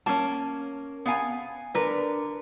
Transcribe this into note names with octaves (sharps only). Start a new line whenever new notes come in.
A#3 C#4 A5
B3 F5 G#5
D3 A#4 B4